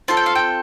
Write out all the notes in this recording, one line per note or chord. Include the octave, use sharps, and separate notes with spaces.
C4 F4 A4 A5
G5
F5
G5